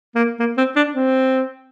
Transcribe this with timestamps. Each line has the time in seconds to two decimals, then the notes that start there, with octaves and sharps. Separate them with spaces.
0.15 A#3
0.39 A#3
0.57 C4
0.76 D4
0.94 C4